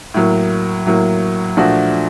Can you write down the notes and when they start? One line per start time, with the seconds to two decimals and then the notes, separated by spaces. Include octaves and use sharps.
0.14 A2 F#3 A#3
0.86 A2 F#3 A#3
1.57 A#2 F3 A3 D4 F#4